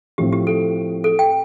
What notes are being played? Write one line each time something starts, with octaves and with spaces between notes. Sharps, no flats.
A2 F3 C4 G4
G4
A4
A4
G5